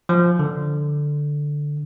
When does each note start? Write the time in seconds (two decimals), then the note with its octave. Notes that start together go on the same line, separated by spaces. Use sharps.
0.09 F3
0.39 D3